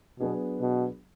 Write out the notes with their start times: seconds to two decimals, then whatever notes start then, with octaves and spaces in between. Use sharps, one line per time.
0.20 B2 F#3 B3 D4 G#4
0.61 B2